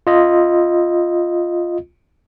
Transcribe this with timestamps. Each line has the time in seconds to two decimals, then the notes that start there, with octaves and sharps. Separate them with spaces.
0.07 F4 D#5